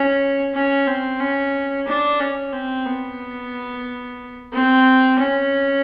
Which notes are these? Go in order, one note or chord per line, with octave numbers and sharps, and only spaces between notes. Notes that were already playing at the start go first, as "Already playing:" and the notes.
Already playing: C#4
C#4
C4
C#4
D4
C#4
C4
B3
C4
C#4